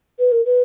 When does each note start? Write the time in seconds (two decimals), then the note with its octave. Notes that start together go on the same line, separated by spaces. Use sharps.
0.19 B4
0.32 A#4
0.45 B4